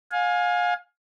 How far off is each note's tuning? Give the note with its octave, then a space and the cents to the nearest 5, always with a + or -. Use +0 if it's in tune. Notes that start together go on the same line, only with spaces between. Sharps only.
F5 +30 G#5 +0